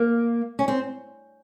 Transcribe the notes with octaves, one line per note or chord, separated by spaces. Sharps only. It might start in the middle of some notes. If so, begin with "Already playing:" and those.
Already playing: A#3
C#4
C4